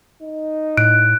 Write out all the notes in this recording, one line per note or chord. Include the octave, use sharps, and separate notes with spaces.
D#4
A2 F#6 D7